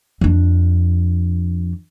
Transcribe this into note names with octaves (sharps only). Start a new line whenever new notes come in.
F2 D4